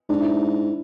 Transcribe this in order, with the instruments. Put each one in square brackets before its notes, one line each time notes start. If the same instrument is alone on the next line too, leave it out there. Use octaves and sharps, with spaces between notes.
[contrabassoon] G#2 [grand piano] D4
[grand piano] E4